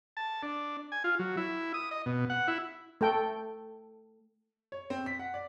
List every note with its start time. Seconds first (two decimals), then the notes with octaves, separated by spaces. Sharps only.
0.17 A5
0.43 D4
0.92 G#5
1.04 F4
1.19 F#3
1.37 E4
1.74 D#6
1.91 D#5
2.06 B2
2.30 F#5
2.48 E4
3.01 A3 A4 G5
4.72 C#5
4.90 C4
5.06 B6
5.19 F#5
5.34 D5